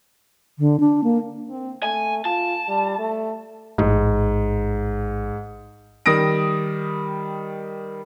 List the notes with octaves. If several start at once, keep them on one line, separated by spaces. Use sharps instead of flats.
D3
D4
A#3
C4
A3 G#5
F4 A5
G3
A3
A1 G#2
D#3 G3 D#6 A#6 D7